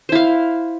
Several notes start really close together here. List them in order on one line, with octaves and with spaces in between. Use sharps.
C5 E4 F5